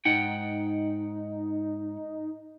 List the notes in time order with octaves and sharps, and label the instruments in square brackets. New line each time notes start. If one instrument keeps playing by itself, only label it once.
[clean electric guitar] G#2 F#5 G5 [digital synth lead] D#4